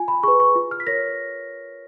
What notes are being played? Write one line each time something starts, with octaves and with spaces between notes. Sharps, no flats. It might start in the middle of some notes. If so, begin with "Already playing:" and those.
Already playing: F4 G#5
B5
G#4 B4 C#6
C#6
F4
F6
B6
A#4 C#5 A#6